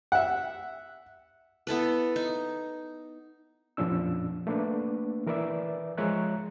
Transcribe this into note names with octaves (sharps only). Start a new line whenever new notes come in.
E5 F#5
B3 E4 A4 B4
D#4
F2 A#2 F3 C#4 D4 E6
A3 A#3 D4 B4
E3 A#4 B4 D5 E5
F3 G#3 C#5 E5 A#5 F#6